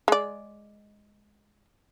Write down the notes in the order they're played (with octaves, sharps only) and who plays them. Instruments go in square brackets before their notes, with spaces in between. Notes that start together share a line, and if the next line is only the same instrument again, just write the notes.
[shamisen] G#3 D5